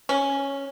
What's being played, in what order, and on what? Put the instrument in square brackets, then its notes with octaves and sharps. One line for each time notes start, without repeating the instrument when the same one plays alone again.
[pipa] C#4